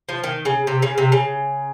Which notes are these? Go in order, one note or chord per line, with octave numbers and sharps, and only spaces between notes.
F3
D#3
C#3
C3
C#3
C3
C#3